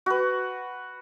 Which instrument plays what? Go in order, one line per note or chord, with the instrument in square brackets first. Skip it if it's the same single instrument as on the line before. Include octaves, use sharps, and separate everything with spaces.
[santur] F#4 B4